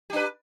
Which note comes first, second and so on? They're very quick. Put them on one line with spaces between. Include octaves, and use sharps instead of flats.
G4 D4 B4